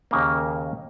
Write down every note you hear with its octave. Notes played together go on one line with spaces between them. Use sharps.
D#2 C#3 A#3